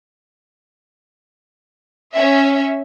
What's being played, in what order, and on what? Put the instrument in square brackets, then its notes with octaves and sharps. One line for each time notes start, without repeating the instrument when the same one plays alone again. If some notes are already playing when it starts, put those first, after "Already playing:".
[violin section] C#4 E5